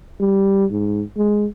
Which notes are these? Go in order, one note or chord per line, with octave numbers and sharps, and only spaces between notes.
G3
G#2
G#3